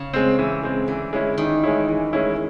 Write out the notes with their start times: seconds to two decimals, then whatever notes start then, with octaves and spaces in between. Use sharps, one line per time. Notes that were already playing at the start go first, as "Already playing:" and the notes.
Already playing: C#3
0.14 G#3 C4
0.39 E3
0.63 G#3 C4
0.88 D3 E3
1.13 G#3 C#4 E4
1.38 D#3 E3
1.64 G#3 C#4 E4
1.88 E3
2.13 G#3 C#4 E4